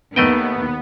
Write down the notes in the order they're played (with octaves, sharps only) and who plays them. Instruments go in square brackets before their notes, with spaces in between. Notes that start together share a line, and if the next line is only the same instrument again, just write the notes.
[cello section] D#2 D#3 [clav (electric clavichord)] A3 D#5 G5 [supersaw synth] B3